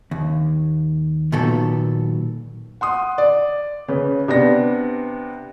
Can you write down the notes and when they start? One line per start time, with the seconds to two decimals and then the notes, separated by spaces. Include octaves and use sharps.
0.11 D#2
1.32 A#2 D#3 F#3 B3 A4
2.81 F#5 C6 D#6
3.18 D5
3.88 C#3 B4
4.28 C3 B3 D4 A#6